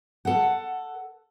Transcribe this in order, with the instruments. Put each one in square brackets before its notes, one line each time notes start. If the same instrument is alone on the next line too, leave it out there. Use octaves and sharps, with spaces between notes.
[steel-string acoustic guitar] A4 F#5